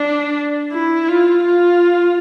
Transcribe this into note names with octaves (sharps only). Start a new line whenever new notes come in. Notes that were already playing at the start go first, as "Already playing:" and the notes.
Already playing: D4
E4
F4
F4